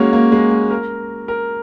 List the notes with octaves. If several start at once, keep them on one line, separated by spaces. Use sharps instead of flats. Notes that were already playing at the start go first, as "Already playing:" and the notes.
Already playing: G#3 A#3 C#4 F#4
A#3
G#3
A#3
A#4
A#4